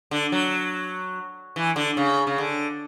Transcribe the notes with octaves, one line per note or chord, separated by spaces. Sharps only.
D3
F#3
E3
D3
C#3
C#3
D3